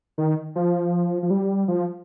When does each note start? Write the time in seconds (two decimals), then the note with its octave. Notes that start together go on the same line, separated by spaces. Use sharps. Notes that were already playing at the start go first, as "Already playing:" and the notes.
0.18 D#3
0.56 F3
1.23 F3
1.31 G3
1.68 F3